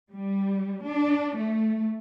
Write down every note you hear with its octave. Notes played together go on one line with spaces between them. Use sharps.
G3
D4
A3